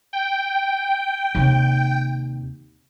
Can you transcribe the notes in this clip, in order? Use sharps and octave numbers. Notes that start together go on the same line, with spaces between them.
G5
D#2 C3